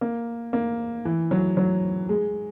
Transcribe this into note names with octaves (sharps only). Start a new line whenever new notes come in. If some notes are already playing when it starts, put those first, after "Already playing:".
A#3
A#3
E3
F#3
F#3
G#3